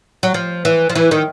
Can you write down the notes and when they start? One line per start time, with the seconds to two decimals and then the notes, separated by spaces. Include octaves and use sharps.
0.23 F#3
0.34 F3
0.65 E3
0.89 F3
0.95 E3
1.11 D#3